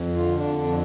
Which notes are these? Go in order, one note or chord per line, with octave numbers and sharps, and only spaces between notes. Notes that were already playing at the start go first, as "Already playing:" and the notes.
Already playing: F2
D3 F4
D4
F2 D4